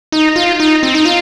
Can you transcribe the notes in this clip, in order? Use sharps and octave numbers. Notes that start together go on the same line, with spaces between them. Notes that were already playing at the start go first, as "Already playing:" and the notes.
D#4
F4
D#4
C4
D#4
F4